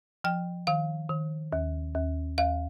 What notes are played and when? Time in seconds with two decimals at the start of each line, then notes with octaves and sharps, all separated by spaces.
0.24 F3 G5
0.67 D#3 F5
1.10 D#3
1.53 D#2
1.95 D#2
2.38 D#2 F5